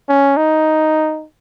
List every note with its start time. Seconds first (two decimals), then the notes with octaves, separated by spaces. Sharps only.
0.09 C#4
0.37 D#4